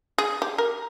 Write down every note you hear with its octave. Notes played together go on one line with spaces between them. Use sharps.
G#4
G4
A#4